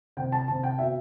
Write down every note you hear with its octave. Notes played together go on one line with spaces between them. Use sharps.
C3 G5
A5
C3 A5
G5
B2 E5